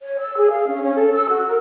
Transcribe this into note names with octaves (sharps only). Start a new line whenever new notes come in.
C#5
E6
G#4
F5
C#4
C#4
A4
E6
F#4
A#4